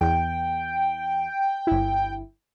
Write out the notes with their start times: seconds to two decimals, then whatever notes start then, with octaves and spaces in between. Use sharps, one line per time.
0.01 E2 G5
1.67 G1 E4